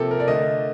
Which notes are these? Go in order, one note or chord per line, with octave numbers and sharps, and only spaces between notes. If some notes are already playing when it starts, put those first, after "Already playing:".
Already playing: C3 F3 A#3 A4
A#4
D5
D3 A3 D#5